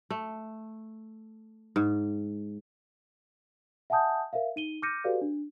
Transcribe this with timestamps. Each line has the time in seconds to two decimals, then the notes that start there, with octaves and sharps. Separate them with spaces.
0.10 A3
1.76 G#2
3.90 E5 F#5 G#5 A5 D#6 G6
4.33 A#4 C5 E5 F5
4.56 D#4 D#7 G7
4.82 D6 F6 G6 A#6 C#7 D#7
5.04 F#4 G4 A4 B4 D5 F5
5.22 D4